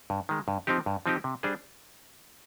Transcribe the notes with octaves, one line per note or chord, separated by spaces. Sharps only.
G2
D#3 G#3
G2
F3 C4 D#4 G4
G2
F3 C4 D#4 G4
C3
G3 D4 G#4 C5